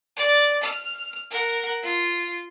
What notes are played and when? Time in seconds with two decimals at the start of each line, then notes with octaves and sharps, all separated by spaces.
0.17 D5
0.63 F6
1.30 A#4 F#5
1.83 F4